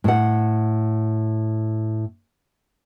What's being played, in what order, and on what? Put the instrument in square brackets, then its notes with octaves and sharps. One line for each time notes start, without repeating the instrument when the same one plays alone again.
[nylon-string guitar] A2 F#5